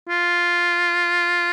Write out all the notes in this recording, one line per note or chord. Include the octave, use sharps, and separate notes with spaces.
F4